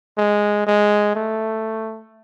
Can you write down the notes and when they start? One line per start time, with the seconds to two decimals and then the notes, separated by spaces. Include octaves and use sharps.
0.18 G#3
0.67 G#3
1.15 A3